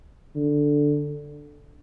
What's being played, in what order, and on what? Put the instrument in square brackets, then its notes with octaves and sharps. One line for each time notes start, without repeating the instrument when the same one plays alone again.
[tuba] D3